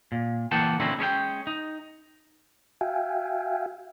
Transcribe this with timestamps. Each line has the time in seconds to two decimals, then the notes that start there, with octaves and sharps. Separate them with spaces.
0.12 A#2
0.51 E3 A#3 F#5 G5 A5
0.80 A#2 D3 C4 C#4 D#4 E4
0.99 G#3 C#4 A#4 G5
1.47 D#4
2.81 F#4 E5 F5 G5 G#5